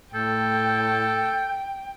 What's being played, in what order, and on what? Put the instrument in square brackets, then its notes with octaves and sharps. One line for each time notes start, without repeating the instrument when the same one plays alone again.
[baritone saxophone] A2 [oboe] A4 [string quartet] G5 [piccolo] G6